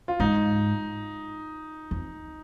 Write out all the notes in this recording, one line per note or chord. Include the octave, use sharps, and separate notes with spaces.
F4
G#2 D#4
F2